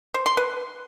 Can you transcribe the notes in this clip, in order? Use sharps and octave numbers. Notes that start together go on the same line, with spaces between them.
C5
C6
B4